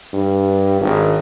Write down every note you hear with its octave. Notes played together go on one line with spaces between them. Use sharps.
G2
G#1